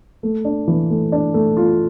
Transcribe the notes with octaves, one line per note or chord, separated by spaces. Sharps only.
A3
D4
E3
A3
D4
A3
F4